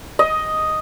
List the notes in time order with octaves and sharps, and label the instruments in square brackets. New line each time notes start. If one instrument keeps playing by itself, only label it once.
[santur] D#5